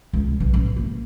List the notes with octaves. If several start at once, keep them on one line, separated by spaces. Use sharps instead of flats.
C#2
B1
A1
A#3